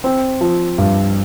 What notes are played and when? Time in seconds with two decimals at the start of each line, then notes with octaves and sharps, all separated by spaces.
0.04 C4
0.41 F3
0.78 G2